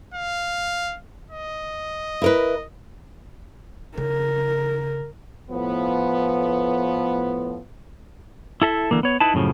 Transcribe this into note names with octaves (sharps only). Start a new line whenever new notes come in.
F5
D#5
E4 A#4 B4
C#3 A#4
A2 F3 B3
E4 A4 E5
D3 E3 A#3
B3 C#5
D#4 E4 B4 A5
F#2 A2 C#3 F3